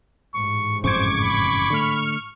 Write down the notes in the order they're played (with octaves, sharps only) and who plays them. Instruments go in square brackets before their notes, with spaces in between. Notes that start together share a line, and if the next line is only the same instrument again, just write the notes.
[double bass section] A1 G#2 [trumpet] C#6
[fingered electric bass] F#1 F2 C#3 [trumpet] C5 [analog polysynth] C#6 D6 G#6
[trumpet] B5
[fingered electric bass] D3 A3 [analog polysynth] C#6 F6